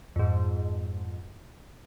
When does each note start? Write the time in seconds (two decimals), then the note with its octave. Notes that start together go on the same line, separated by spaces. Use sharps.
0.16 F2 G#2